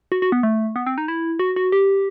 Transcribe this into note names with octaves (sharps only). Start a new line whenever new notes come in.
F#4
F#4
B3
A3
B3
C4
D#4
E4
F#4
F#4
G4